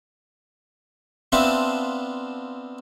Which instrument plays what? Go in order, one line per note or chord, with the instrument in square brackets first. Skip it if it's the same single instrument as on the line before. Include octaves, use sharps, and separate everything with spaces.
[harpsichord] B3 C4 D4 F4 E5 A5